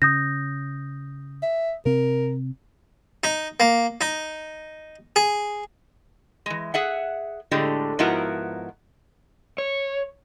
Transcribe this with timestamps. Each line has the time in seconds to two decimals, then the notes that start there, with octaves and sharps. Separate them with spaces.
0.02 C#3 D#6 G6 A#6
1.43 E5
1.86 C3 C4 A#4
3.24 D#4
3.60 A#3
4.01 D#4
5.16 G#4
6.46 E3 G#3
6.74 G#4 E5 F#5
7.51 A2 D3 G#3 G4
7.99 G#2 F3 B3 E4 F#4 A#4
9.58 C#5